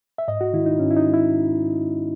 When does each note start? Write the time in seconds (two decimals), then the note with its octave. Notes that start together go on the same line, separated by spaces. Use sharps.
0.18 E5
0.28 G#2 D#5
0.41 F#4
0.53 D#3 G#3 E4
0.66 D#4
0.80 G#2 C#4
0.91 E4
0.97 D#4
1.05 D#3 G#3
1.14 E4